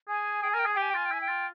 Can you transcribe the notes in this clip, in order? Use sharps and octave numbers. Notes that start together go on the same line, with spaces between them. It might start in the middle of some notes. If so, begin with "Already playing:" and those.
G#4 G#5
G#4 G5
G#5
A#4 G5
G#4 G#5
G4 G5
G#5
G5
F4 G#5
G5
E4 G#5
G5
F4